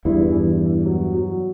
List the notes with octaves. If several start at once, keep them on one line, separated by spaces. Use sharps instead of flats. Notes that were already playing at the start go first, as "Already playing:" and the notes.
E2 G2 E4
E3
E3
F#3
F#3